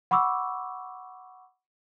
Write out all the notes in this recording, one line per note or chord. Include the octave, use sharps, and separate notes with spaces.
F#5 B5 C#6 D6 E6